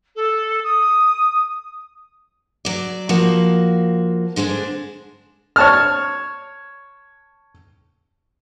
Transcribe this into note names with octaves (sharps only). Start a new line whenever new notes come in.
A4
D#6
F#3 D5
F3 A#3 F#4
D3 G#3 C4 D4
C#5 A5 F6